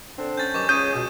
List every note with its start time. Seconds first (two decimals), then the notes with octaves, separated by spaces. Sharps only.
0.18 D3 C4 D4
0.37 C#4 G6 A6
0.54 G2 D#3 F#3 C#6 D6
0.69 C#2 C#3 C#4 G#4 C#5 D#6 G6 D#7
0.94 C#2 B2